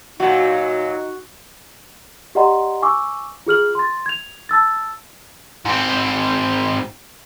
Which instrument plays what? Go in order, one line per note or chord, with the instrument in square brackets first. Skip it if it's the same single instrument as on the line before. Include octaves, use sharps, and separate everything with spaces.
[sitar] A#2 F#3 [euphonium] D#4 [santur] F#4
[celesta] G4 D5 D#5 F#5 A#5 C6
G#5 C#6 D6 E6
F4 G#4 F6 F#7
C6 A6
G#6 F7
A5 E6 A6
[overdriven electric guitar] G#2 C4